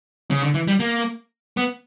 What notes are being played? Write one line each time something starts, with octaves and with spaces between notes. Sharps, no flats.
C#3
D3
E3
G3
A#3
B3